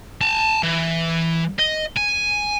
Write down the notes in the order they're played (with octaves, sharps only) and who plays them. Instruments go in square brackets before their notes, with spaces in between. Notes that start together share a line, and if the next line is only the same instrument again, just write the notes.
[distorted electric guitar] A5 A#5
E3
D#5
G#5